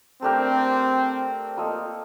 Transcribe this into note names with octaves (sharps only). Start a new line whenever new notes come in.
A3 C4 D4 G4 A#4
A#3 F4 A4 D#5